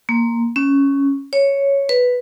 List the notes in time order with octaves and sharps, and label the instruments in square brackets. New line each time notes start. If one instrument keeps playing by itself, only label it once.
[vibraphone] A#3
C#4
C#5
B4